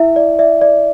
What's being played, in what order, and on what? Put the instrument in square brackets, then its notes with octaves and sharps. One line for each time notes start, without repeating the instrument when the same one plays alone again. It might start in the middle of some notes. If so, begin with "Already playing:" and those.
Already playing: [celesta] E4 E5
D5
D5 E5
D5